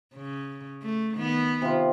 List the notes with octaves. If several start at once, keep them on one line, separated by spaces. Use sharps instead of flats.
C#3
A3
D#3 B3
C3 F4